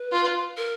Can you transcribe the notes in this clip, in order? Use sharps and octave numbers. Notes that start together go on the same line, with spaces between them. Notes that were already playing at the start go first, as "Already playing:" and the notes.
Already playing: B4
F4
A#4